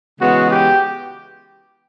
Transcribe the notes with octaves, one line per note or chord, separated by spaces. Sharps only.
C#3 E3 G#3 B3 F#4
G4